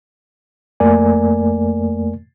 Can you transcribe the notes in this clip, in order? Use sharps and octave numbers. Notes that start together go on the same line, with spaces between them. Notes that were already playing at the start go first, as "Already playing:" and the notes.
F2 A3 A#3 A#4 D5 G#5